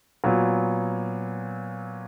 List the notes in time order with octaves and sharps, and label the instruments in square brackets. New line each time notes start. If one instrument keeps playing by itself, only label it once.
[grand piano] A#2 F#3 B3